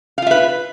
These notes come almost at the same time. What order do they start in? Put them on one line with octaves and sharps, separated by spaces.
F5 F4 E5 B4